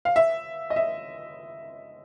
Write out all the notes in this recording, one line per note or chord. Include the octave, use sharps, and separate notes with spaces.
F5
E5
D#5
E5